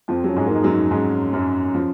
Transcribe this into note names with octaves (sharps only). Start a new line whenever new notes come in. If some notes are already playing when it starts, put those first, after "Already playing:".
F2 F3 C4
F#3
C#4
G#2 G#3
A#3 D#4
G#3
F#2 F#3
D#4
G#2 G#3 C#4
F#2 F#3
F3